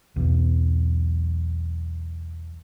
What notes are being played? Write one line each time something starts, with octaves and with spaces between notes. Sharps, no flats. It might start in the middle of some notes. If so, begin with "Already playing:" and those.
B1 E2